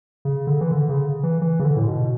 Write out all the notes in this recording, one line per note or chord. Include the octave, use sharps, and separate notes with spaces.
C#3
D3
E3
D3
C#3
E3
E3
C#3
D3
A2
B2